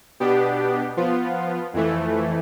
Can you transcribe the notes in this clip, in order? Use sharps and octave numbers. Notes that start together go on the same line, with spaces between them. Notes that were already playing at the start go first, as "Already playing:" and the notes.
B2 B3 D4 G4
F3 B3 F4
F2 E3 A3